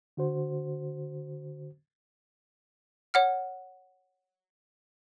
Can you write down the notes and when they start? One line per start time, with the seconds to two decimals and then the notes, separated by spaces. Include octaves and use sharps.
0.17 D3 F#4 C5
3.14 C#5 F#5 F6